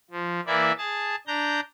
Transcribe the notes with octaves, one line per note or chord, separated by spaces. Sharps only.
F3
E3 A#3 E4 D5 E5
G#4 A5
D4 A#5 G6